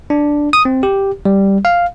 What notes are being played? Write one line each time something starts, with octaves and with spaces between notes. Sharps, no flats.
D4
D#6
C4
G4
G3
F5